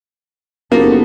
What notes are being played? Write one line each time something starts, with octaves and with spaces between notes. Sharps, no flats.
F#1 A#3 B3 D#4 G4 A4 A#4